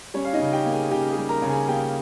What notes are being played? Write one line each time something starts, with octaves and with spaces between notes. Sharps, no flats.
G3 C#4 C#5
F5
D#4 D#5
C#3
G4 G5
A#3
G#4 G#5
C#3 G4 G5
G#4 G#5
G3
A#4 A#5
C#3
G#4 G#5
A#3 G4 G5